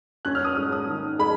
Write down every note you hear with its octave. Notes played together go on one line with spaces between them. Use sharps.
C#4 F#6
F6
D#6
G#2 F6
D#6
D#3
G#3 B5